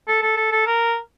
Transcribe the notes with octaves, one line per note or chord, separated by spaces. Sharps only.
A4
A4
A4
A4
A#4